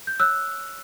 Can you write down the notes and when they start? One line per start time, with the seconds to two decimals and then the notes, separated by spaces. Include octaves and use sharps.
0.07 G6
0.20 C#5 E6 F#6